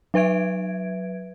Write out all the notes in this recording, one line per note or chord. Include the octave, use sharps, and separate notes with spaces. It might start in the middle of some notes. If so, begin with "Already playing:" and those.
F#3 B4 E5 G#6 D7